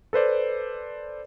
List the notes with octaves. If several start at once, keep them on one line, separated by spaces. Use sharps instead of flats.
A4 B4 C5 D5